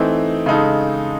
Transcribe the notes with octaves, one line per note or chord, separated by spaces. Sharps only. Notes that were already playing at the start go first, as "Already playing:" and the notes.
Already playing: E3 A3 C4 D#4
C#3 G#3 D#4 A4